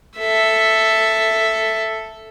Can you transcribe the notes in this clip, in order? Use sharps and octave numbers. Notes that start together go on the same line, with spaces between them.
A4 E5